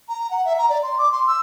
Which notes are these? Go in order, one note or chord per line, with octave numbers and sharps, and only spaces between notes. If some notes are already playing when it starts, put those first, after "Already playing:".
A#5
F#5
E5
A#5
D5
C6
D6
C6
E6